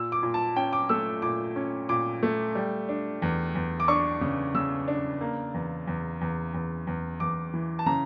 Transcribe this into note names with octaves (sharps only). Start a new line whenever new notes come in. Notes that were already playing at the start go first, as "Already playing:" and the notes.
Already playing: A#2 E6
D6
A#2
A5
C#4 G5
D6
A3 E6
A#2 D6
C#4
A#2 D6
A3
G3
D4
E2
E2
D6
D4 C#6
C#3
C#3 E6
D4
A#3
E2
E2
E2
E2
E2
E2 D6
E3
A5
C#3 A#5